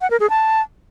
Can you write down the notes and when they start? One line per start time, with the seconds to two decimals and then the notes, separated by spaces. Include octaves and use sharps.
0.01 F#5
0.10 A#4
0.20 G#4
0.30 A5